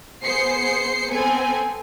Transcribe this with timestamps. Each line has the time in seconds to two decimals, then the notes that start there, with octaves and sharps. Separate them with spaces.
0.24 B3 G#4 C5 C7 C#7
1.11 B3 C4 A4 G#5